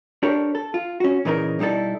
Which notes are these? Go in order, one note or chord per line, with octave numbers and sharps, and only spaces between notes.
D4 G4 A4 A#4 C#5
A4
F4
C#4 F#4
A#2 C#3 E3 D#4 A4 A#4
B2 G3 D#4 E4 A4